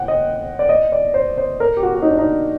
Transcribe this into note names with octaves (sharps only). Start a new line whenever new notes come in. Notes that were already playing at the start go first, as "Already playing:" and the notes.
Already playing: F#5 G5
D#5
D5
D#5
D5
C5
C5
A#4
G4
F#4
F#4
D#4
D4
D#4